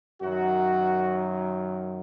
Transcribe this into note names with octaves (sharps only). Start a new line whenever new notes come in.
F#2 D#3 F#3 F#4